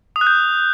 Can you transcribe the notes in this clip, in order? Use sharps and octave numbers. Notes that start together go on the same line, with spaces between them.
D#6
F#6
G6